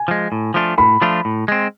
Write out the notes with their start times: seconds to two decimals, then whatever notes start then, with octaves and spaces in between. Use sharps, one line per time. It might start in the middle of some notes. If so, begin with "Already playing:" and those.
Already playing: G#5
0.08 F3 G#3
0.32 A2
0.54 F3 A3 D4 F4
0.78 A2 B5
1.02 F3 A3 D4 F4
1.25 A2
1.48 G#3 C4